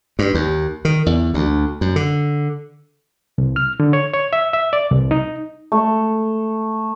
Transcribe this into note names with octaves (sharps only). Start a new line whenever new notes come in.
G2
D#2
D#3
E2
D2
F#2
D3
C2
F6
D3
C#5
C#5
E5
E5
D5
C2
D#4
A3